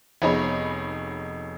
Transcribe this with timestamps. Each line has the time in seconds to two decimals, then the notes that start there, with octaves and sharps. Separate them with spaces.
0.22 F1 B3 D#4 G#4 C#5 B5